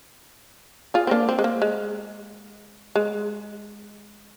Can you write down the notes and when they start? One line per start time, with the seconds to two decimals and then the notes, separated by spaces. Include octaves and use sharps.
0.94 F4 G#4
1.07 C4
1.11 A#3 D4
1.29 C4
1.39 G#3
1.44 A#3
1.62 G#3
2.95 G#3